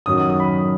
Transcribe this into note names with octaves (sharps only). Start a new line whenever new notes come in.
F#2 D#3 F#3 D#6
D#6
D#6
B5